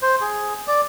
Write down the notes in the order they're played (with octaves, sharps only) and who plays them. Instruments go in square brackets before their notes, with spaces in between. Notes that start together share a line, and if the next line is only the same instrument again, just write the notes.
[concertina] C5
G#4
D5